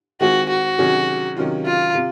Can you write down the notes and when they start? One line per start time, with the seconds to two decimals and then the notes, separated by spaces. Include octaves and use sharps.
0.21 D#3 G#3 C4 F4 F#4 G#4
0.49 F#4
0.79 C3 D#3 F#3 C#4 G#4
1.36 C3 D#3 F#3 C#4 F4
1.66 F4
1.95 C3